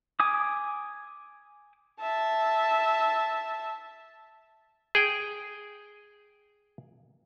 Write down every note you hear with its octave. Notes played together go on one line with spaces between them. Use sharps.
G#5 D6 D#6
E5 A5
G#4 G5